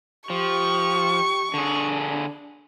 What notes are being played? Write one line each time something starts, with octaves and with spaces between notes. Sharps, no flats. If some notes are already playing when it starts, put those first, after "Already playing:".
F3 G4 C#6
D3 D4 G#4